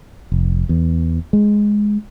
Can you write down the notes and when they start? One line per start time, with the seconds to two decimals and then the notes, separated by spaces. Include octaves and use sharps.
0.32 F1
0.69 E2
1.33 G#3